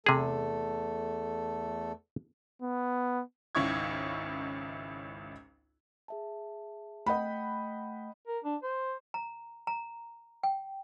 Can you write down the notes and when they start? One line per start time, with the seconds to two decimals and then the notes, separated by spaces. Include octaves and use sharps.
0.06 E2 C3 A3 G#4 A4
2.62 B3
3.55 G#1 C#2 C#4 E4 C#6 G#6
6.08 G#4 E5 A5
7.06 A3 D#5 F#5 G5 B5 G6
8.27 A#4
8.44 D4
8.63 C5
9.14 A#5
9.67 A#5
10.43 G5